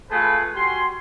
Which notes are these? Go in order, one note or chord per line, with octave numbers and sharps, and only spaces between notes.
A3 F4 G#4 B4
G3 F#4 G#5 C6